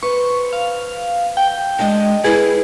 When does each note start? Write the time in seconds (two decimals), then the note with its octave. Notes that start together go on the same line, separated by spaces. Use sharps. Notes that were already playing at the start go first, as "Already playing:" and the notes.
0.03 B4 C5 C#6
0.53 F5
1.37 G5
1.79 G#3 D4 G#4 D#5
2.24 E4 G#4 B4